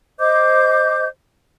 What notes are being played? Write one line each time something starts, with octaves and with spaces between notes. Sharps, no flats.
C5 D#5 D6 G6